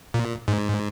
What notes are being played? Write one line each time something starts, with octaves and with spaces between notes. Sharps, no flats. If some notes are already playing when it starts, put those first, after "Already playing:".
A#2
G#2